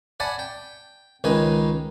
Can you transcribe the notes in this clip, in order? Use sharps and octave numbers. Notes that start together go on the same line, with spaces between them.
D5 F#5 G#5 A5 B5
G5
C#2 D#3 D#4 B4 G#5